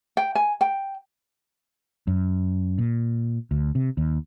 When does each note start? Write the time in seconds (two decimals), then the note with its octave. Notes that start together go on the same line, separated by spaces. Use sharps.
0.17 G5
0.35 G#5
0.61 G5
2.07 F#2
2.78 A#2
3.51 D2
3.75 C3
3.97 D#2